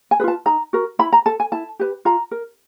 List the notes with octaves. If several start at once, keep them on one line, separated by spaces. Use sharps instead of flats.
G#5
F4 G#4 B4 A5
D#4 A#5
F#4 A#4
E4 B5
A#5
A4 A5
G#5
E4 A5
G4 B4
F4 A#5
A#4